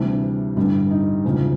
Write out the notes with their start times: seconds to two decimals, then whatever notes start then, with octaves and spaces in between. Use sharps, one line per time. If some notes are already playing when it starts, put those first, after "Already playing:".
Already playing: D2 C3 E3 G3 D4
0.57 A1 G2 D3 G3
0.91 D#4
1.25 E1 D2 C#3 F3